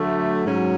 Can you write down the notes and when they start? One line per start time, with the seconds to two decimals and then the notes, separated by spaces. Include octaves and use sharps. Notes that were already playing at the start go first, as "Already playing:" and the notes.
Already playing: D3 F#3 A3
0.45 G#2 F#3 C#4